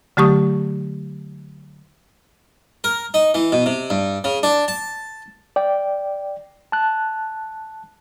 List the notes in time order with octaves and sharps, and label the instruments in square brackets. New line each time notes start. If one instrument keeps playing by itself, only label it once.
[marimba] D3 F#3 A3 G4 C#6 D#6
[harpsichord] A#4
D#4
E3
B2
C3
G2
C#3
D4
A5
[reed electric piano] D5 G5
A5 F#6